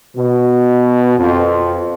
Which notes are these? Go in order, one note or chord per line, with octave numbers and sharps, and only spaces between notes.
B2
F2